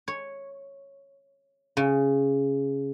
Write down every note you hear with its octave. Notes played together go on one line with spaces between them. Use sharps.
C#5
C#3